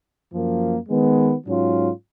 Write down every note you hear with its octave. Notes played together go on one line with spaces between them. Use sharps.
F#2 F3 A#3
D#3 G#3 B3
G#2 F#3 C#4 F4